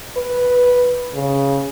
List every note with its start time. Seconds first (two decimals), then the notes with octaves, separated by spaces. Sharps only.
0.17 B4
1.14 C#3